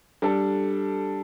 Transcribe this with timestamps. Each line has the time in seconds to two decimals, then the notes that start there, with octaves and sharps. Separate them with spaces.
0.22 G3 D4 A4